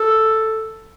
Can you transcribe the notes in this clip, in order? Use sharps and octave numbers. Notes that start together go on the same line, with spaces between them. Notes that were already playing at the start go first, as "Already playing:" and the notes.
Already playing: A4